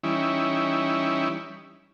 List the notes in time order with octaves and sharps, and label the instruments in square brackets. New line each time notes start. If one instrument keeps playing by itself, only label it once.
[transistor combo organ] E3 G3 C#4 D#4 E4